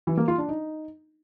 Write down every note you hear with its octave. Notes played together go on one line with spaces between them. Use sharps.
E3
A#3
F4
D4
D#4